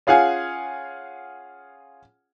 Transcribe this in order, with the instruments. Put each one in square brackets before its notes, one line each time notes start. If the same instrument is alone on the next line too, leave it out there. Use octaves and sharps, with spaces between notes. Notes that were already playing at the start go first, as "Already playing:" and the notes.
[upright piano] C#4 F4 G#4 F5 F#5 G#5